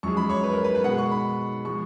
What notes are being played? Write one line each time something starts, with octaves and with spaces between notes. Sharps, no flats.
F#2 F3 G#3 C#6
B5
C#5
B4
A#4
B4
B4
B2 G#3 F#5
C#6
B5
F3 G#3 C#6